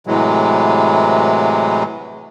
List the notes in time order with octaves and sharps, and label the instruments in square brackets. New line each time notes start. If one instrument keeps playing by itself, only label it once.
[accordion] A2 C3 E3 F#3 G#3